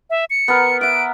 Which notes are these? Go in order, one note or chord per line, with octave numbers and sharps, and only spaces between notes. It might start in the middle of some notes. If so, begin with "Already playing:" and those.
E5
C#7
B3 A#4
E5 F#5 D7